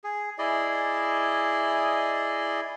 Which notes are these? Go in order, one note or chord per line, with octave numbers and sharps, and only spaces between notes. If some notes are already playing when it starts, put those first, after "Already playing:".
G#4
E4 G#4 D5 D#5